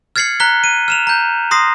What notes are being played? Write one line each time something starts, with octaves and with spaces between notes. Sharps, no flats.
F6 G#6 A6 C7 C#7 F#7
A#5 F#6 B6 G7
D#7
F6 E7 F7
A#5 G6
C6 D#6 A#6 C7